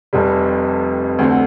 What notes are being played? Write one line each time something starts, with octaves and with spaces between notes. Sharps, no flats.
F1 F2 C3 G3
D2 D3 A3 C4